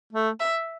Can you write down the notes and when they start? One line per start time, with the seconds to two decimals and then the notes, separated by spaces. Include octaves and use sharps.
0.13 A3
0.40 E5